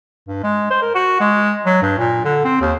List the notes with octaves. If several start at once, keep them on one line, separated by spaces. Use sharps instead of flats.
G2
G#3
C5
A#4
F#4
G#3
F#3
G2
A#2
D3
C4
D#2